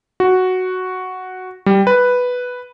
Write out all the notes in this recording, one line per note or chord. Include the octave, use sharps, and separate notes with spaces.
F#4
G3
B4